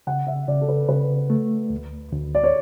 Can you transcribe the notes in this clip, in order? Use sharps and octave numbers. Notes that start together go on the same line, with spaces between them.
C#3 F#5
E5
C#3 D5
A4
B4
C#3 B4
A3
D2
D2
D5
C#5